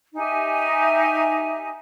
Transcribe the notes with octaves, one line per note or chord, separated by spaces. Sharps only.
D#4 G4 E5 G#5